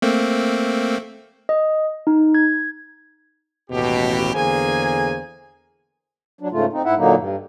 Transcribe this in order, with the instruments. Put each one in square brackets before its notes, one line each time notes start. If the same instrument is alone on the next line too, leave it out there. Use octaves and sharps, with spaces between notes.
[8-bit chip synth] A3 A#3 C4
[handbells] D#5
D#4
G#6
[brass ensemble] A1 D#2 B2 G4
E2 D3 A#3 G#4 C5 G#5
[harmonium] F#3 D4
G#2 C#3 A3 F4
C4 D#4
G#2 E4 E5 F#5
A#2 D3 F#3 A#3 D#4
G2